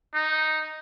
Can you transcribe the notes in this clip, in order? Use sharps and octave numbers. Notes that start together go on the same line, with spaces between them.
D#4